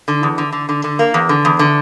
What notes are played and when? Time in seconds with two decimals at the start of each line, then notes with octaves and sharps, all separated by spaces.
0.08 D3
0.23 E2
0.38 D3
0.52 D3
0.69 D3
0.84 D3
0.99 A#3
1.14 E2
1.29 D3
1.45 E2
1.59 D3